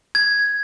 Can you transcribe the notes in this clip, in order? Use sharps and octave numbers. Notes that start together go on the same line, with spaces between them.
G#6